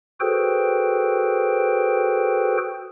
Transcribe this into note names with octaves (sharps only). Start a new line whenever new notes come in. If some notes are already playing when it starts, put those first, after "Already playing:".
F#4 G#4 A4 B4 C5 G5